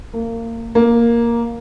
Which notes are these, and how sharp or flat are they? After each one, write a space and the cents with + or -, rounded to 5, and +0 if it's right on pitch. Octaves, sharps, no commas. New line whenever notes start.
A#3 -25
A#3 +5